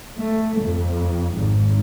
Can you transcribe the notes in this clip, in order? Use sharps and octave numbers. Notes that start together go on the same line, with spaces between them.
A3
F2
G#1 G#2